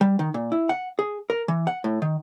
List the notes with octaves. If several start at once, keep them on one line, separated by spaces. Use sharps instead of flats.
G3
D#3
A#2
E4
F#5
G#4
A#4
E3
F#5
A2
D#3